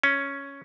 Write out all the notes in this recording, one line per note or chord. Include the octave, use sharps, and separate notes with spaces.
C#4